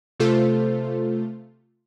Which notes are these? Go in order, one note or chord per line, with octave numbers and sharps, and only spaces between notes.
C3 A3 F4 A4 C5